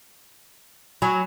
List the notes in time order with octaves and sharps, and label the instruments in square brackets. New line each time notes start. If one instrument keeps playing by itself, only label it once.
[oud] F#3 [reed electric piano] G#5 B5